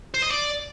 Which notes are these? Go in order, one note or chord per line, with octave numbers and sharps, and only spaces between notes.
C5
D#5
D5